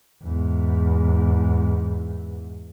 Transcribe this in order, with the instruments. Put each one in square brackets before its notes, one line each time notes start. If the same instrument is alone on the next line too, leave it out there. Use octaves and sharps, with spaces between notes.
[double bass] E2 G#2